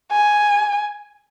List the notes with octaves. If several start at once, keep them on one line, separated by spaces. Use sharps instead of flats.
G#5